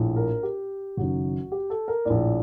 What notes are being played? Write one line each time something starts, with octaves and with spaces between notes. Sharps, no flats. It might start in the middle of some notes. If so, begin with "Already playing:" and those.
Already playing: A#1 A2
A#4
G4
F#1 F#2 D#3 F#4
G4
A4
A#4
A#1 A2 D5